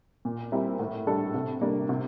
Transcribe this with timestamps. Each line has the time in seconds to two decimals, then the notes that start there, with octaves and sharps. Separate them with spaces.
0.25 A#2
0.52 G3 C4 E4 A#4
0.79 A2
1.07 G3 D4 A4
1.34 C3
1.61 G3 A#3 D4
1.89 C3